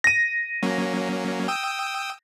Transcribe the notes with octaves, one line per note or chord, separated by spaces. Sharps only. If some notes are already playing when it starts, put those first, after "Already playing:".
A#6 D#7
F#3 A#3 C#4
G5 D#6 E6